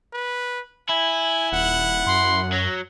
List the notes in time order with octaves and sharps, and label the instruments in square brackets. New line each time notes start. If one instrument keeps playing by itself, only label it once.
[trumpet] B4
[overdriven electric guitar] E4 [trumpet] G#5
[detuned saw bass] D#1 [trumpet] F#5
[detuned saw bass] F#2 [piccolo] C6
[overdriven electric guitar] F#3 [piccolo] A#6